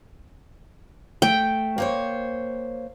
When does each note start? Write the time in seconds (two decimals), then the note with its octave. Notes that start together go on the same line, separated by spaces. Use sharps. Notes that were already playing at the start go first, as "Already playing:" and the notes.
1.22 A3 G5
1.78 A#3 C5 C#5